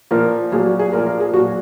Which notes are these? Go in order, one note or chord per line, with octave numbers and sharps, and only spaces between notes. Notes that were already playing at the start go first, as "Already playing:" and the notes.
A#2 F3 A#4
A#2 F#3 G#4
F#4
G#4
A#2 F3 A#4
A#4
G#4
A#2 F#3 F#4